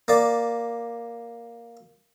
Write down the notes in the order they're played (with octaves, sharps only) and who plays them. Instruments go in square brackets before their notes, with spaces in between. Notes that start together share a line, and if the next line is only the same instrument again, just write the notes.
[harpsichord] A#3 D5